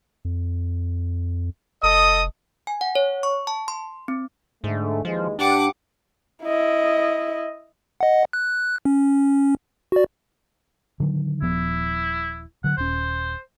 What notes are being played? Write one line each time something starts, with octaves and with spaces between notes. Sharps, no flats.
F2
F1 A4 D#5 D#6
G#5
F#5
C#5
C#6
A5
C6
C4
G#2 D3 A3
D#2 E3 F3 G#3
G2 D4 G4 F#5 D6
E4 D#5
D#5 F#5
F#6
C#4
F#4 D5
D3 D#3 F#3
D#1 F3 B3 E4
D3 F#3 F#5
D#1 C#4 C5